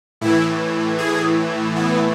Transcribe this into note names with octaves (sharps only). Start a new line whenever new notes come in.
A2 E3 E4
G#4
B3